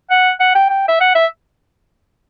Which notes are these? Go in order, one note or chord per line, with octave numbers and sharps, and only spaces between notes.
F#5
F#5
G5
G5
E5
F#5
E5